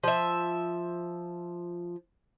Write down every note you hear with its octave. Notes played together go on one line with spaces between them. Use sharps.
F3 E5